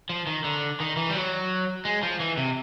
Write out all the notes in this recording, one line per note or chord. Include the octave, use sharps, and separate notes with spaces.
F3
D#3
D3
D#3
E3
G3
F#3
G#3
F3
E3
C3